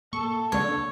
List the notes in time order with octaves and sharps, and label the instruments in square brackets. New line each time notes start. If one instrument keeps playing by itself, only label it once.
[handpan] A#3 [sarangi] A4 [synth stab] C#6
[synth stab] C#2 D3 [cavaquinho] C#5